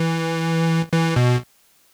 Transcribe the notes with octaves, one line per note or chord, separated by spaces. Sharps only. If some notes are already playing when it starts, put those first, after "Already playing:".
Already playing: E3
E3
B2